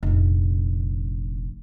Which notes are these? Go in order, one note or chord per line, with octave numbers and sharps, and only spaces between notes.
F1 A#1